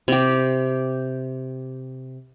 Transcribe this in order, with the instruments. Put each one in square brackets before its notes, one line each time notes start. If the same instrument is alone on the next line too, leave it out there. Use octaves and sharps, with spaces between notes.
[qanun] C3 G4